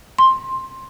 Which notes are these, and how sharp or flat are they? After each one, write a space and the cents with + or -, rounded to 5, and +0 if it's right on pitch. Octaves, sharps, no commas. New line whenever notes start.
C6 +15